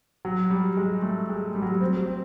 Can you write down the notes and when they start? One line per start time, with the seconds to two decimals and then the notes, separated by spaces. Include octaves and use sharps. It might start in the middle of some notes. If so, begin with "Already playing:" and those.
0.25 F#3
0.50 G3
0.77 G#3
1.02 A3
1.29 G#3
1.55 G3
1.62 F#3
1.71 G3
1.81 C4
2.07 C4